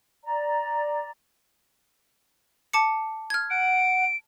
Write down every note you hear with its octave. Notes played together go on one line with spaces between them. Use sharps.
D5 A#5
A5 D6 C#7
F6 G#6
F#5 D7